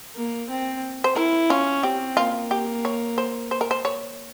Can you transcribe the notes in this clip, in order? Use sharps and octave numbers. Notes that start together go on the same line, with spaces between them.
A#3
C4
C5
E4 A#4
C#4 F4
C4 G4
A#3 F4
G4
C#5
C5
C5
A#4
C5
C#5